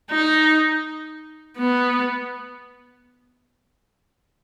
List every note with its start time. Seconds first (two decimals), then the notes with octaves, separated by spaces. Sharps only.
0.11 D#4
1.58 B3